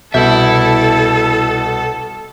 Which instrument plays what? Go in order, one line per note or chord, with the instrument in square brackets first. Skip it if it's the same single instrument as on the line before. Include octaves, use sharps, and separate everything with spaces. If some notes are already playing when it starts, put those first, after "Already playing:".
[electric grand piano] C2 B2 G6 [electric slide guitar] E4 E5 [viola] A4